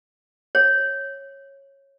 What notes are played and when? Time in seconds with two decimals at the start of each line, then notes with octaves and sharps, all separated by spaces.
0.55 C#5